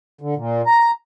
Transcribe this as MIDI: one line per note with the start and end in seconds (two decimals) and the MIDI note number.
0.21 0.35 50
0.37 0.62 46
0.66 0.91 82